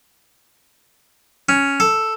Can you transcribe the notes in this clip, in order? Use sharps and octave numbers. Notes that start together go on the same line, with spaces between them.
C#4
A4